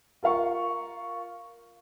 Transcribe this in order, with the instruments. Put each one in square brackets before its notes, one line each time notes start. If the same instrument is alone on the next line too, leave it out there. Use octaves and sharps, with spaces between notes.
[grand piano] F4 A#4 F5 C#6